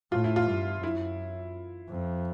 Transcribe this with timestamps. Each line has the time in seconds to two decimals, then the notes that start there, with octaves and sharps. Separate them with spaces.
0.12 A2 F4
0.24 E4
0.36 F4
0.47 G2
0.82 F#2 E4
1.89 F2